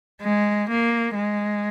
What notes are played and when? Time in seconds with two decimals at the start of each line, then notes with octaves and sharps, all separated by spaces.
0.22 G#3
0.69 A#3
1.14 G#3